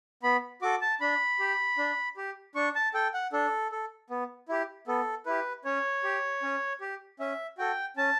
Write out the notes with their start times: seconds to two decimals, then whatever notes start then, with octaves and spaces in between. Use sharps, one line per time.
0.23 B3 B5
0.62 F#4 A4 D6
0.81 A5
1.00 D4 B5
1.39 G4
1.78 D4
2.17 G4
2.55 D4 C#6
2.75 A5
2.94 A4 G5
3.14 F#5
3.33 D4 A4
3.72 A4
4.10 B3
4.49 E4 G4
4.87 B3 A4
5.26 E4 G4 B4
5.65 C#4 C#5
6.04 G4
6.42 C#4
6.81 G4
7.20 C#4 E5
7.58 F#4 A4 G5
7.97 C#4 A5